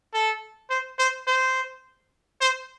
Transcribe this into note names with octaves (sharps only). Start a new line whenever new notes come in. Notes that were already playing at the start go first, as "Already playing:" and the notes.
A4
C5
C5
C5
C5